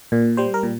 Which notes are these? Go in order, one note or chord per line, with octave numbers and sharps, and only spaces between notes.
A#2
G3 C5
A#4
A#2